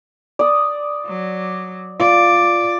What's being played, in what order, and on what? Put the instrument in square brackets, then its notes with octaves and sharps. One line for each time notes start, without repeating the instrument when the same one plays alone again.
[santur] D5 D#6
[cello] F#3
[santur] F4 [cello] D5